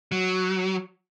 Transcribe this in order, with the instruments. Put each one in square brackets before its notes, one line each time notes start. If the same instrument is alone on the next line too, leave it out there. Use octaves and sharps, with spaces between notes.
[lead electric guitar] F#3